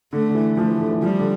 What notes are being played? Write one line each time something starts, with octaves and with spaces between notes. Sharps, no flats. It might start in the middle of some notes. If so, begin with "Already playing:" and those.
D3 A3
D3
E3
F3 A3
E3
D3
E3
F3 G3
D3